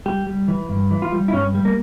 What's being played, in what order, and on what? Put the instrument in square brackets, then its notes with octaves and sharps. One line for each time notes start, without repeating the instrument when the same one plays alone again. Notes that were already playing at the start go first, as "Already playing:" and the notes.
[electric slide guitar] G3 G4
G3
E3
G2
E3
F4
G3
E4
G2 C#4
G3
A#3